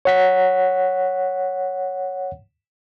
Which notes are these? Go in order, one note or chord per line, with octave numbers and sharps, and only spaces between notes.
C#5 F#5 B6